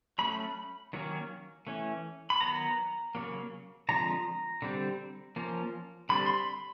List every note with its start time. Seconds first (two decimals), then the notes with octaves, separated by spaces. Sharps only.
0.19 F#3 A3 C#4 B5
0.93 D#3 F#3 A#3 C#4
1.67 E3 A3 C#4
2.30 B5
2.41 D#3 F#3 B3 A#5
3.15 C#3 F#3 A#3
3.89 D3 F3 G#3 C4 A#5
4.62 D3 G3 C4
5.36 F3 A#3 C#4
6.09 D3 G3 C4 B5
6.26 C6
6.34 B5